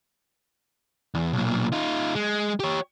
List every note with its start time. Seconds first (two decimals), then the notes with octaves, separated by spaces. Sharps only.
1.15 E2
1.33 B1 A#2
1.72 D#4 F4
2.15 G#3
2.60 G4 C#5